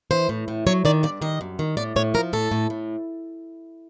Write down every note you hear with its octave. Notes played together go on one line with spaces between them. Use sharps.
E3 C5
A2
A2
F#3 C#5
D#3 D5
G2 D5
D#3 D#5
F#2
D#3
A2 D5
A2 C#5
F3 A#4
A2 A4
A2
A2